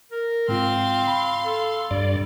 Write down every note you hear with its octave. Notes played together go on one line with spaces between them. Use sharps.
A#4
G#2 C4 F4 F5 C6
B5
A4
G2 G3 D5